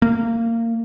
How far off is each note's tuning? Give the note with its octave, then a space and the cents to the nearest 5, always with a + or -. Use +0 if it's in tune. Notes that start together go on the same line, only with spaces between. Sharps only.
A#3 -20